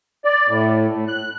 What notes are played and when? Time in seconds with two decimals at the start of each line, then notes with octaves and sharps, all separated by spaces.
0.25 D5
0.48 A2
0.93 A2
1.08 F#6